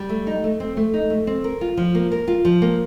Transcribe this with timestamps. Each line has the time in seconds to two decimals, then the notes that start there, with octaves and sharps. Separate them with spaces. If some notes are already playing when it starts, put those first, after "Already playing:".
Already playing: G3
0.09 A3
0.27 D#4
0.44 A3
0.60 C4
0.77 A3
0.93 D#4
1.10 A3
1.27 C4
1.44 A#4
1.61 F4
1.77 F3
1.95 A#3
2.12 A#4
2.28 F4
2.45 F3
2.62 A#3